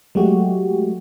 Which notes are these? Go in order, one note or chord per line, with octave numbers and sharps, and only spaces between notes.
F#3 G#3 A3 F#4 G4